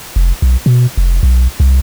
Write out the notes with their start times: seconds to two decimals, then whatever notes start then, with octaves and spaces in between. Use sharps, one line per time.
0.16 F1
0.42 B1
0.66 B2
0.97 F1
1.23 B1
1.60 C2